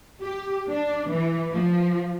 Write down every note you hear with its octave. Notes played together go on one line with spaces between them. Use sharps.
G4
D4
E3
F3